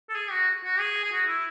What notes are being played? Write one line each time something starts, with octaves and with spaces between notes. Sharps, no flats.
A4
G#4
F#4
F#4
G#4
G#4
F#4
E4